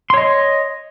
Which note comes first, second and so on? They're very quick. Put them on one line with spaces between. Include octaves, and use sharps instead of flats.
C6 C#5 D#5